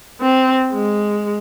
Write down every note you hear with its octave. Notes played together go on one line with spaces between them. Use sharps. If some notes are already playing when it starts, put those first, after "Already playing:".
C4
G#3